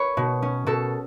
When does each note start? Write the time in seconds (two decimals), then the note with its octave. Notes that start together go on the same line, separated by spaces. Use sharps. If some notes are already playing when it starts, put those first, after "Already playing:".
Already playing: B4 C#5
0.17 B2
0.42 C#4
0.66 B2 A4